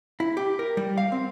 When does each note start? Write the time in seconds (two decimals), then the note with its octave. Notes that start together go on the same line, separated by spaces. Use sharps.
0.20 E4
0.37 G4
0.59 A#4
0.77 G3
0.98 F5
1.12 C4